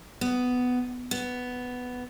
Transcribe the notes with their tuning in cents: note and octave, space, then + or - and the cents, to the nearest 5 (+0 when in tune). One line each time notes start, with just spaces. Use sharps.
B3 +10
B3 +5